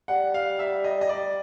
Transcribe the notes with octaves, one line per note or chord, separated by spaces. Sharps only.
G3 F#5
F5
E5
D#5
D#5
D5